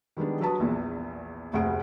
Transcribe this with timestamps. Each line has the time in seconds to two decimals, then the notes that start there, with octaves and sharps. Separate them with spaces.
0.17 D#3 G3 G#3 B3 D4
0.41 F#3 B4 A5 D#6
0.60 A#1 E2 A#2
1.53 F1 D2 C3 G#4 F#5 D7